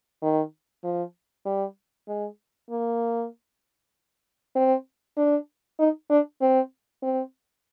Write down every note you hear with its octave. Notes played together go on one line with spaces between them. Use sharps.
D#3
F3
G3
G#3
A#3
C4
D4
D#4
D4
C4
C4